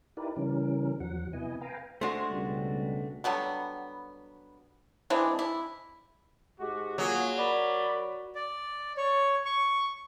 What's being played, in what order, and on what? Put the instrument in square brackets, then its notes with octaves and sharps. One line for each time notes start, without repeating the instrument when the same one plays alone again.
[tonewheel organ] D#4 E4 G4 A#4 B4 D5
C#3 E3 G3 C#4 A#4
E2 F3 F#3 F#5
C3 B3 E4 D#5 G#5
B4 F5 G5 G#5 A#5
[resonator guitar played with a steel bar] G#3 C5 [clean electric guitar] A3 D4 F#4
[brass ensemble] C#2 B2 G3
[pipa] D3 F#3 G3 B3
E3 G#3 C4 D4
E4
[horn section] G#2 G#3 F#4 [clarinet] G4
[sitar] F#3 [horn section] A#3 F4 G#4
[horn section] A#4 B5 [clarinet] D5
[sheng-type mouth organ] D5
C#5
C#6